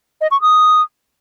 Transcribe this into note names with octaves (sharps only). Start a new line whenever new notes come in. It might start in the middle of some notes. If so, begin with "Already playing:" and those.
D#5
C#6
D#6